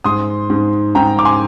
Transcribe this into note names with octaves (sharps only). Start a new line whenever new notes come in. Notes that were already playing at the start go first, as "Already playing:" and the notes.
G#2 C6 D#6
G#2
G#2 G5 A#5
D6
G#5 C6